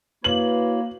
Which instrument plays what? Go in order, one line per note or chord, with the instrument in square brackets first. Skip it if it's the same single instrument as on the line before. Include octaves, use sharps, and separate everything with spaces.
[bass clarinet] A#3 [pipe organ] E4 F#4 C#5 [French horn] B4 [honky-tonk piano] F#7